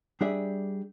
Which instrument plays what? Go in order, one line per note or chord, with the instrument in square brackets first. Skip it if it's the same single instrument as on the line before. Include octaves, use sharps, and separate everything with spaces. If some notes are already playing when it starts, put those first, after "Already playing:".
[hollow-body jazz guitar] G3 D4 G#4 D5 E5